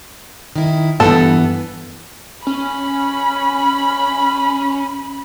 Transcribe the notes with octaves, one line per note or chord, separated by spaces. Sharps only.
D#3 E4
G2 E3 B3 A4
C#4 B5